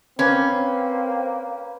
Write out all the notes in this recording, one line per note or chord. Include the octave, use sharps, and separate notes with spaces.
A#3 C4 C#4 B4 C5 B5